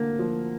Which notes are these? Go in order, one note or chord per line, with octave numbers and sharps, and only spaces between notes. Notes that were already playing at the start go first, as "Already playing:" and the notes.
Already playing: D3 A#3
F3